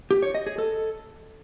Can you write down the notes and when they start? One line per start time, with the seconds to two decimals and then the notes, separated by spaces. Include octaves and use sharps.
0.11 G4
0.23 C#5
0.35 D#5
0.46 G#4
0.58 A4